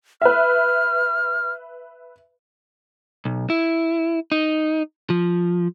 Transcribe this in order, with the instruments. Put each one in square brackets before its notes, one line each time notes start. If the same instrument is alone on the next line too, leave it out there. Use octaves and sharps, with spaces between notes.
[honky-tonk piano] B4 E5 [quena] F6
[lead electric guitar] B1
E4
D#4
F3